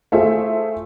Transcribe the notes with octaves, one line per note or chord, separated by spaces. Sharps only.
A3 F4 G#4 C5 E5